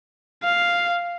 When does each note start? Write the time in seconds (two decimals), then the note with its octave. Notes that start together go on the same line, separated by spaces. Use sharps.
0.44 F5